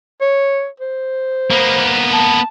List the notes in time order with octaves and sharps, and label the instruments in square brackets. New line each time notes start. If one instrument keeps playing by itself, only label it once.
[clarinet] C#5
C5
[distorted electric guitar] A#3 B3
[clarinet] A5